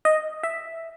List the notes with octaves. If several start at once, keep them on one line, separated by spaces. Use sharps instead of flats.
D#5
E5